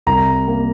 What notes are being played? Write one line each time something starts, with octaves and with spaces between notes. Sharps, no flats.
C2 A#5
A#3